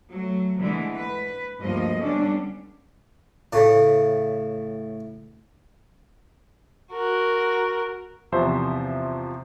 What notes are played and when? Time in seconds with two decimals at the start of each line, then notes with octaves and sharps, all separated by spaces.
0.10 F#3 A3
0.60 D3 E3 G#3 A3
0.93 B4
1.61 D2 G2 F3 A#3 D#5
2.01 D3 G3 B3 C#4 D4
3.53 A2 C#3 A3
6.92 F#4 A#4
8.32 E2 C3 F3 C5 E5